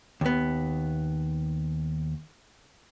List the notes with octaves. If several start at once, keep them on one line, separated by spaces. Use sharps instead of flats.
D#2 B3